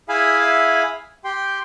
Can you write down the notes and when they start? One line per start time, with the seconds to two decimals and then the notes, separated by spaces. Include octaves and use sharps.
0.09 E4 G#4 E5 F5 G#5 B5
1.24 G4 G5 C6